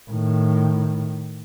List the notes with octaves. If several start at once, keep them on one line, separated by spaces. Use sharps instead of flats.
A2 D#3